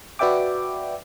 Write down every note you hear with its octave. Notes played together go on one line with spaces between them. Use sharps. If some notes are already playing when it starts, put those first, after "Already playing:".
F#4 B4 D5 E5 G5 D6